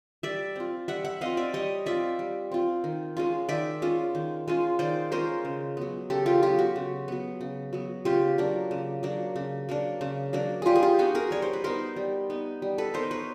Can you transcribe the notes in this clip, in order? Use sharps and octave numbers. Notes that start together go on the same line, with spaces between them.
G3 D5 E5
C4 F4
G3 E5 F#5
E5 F#5
C4 F4 D#5 F5
D5 E5
G3 C#5 D#5
C4 F4 D5 E5
G3
C4 F4
D#3
G#3 C#4 F4
D#3 D5 E5
G#3 C#4 F4
D#3
G#3 C#4 F4
D#3 C5 D5
G#3 C#4 F4 A#4 C5
C#3
F#3 B3
C#3 G4 A4
F4 G4
F#3 B3 F4 G4
F#4
C#3
F#3 B3
C#3
F#3 B3
C#3 F4 G4
F#3 A#3 D4
C#3
F#3 A#3 D4
C#3
F#3 A#3 D4
C#3
F#3 A#3 D4
G3 F4 G4 G#4
G#4
F4 G4
B3 D#4 F#4 G#4
G#4 A#4
G3 C#5
C5
B4
B3 D#4 A#4 C5
G3
B3 D#4
G3
A4 B4
B3 D#4 A#4 C5
B4 C#5